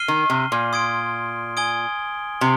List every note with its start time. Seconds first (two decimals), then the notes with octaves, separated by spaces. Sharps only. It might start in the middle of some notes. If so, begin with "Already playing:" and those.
Already playing: F6 C7 D#7 G7
0.08 D#3
0.30 C3
0.52 A#2
0.73 C6 D#6 G#6 D7
1.57 G#5 D#6 G#6 D7 G7
2.41 C3 G7